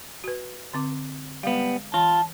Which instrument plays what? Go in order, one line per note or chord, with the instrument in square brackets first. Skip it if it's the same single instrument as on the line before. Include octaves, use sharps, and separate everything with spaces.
[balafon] F#4 B4
D3 C4 D6
[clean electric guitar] G3 B3 [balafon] G#3 F5
[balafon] E3 C6 [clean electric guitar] F4 [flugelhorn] A5